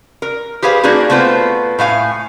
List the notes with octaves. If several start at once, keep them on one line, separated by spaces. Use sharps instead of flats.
A#4
G4 G#4 B4 C5 F5
A#3 D4 D#4 F#4 G#4
A3 B3 C4 F4 C5
A2 A3 F5 G#5